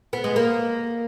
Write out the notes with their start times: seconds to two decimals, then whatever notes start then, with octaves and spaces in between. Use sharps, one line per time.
0.13 B3
0.24 G#3
0.36 A#3